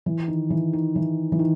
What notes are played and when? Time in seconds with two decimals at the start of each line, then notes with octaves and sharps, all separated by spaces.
0.06 E3
0.28 D#3
0.50 E3
0.73 D#3
0.96 E3
1.32 E3
1.39 D#3